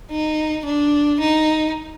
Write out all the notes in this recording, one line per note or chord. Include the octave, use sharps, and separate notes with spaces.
D#4
D4
D#4